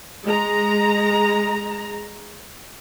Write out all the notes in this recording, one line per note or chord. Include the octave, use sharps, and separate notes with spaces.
G#3 A#5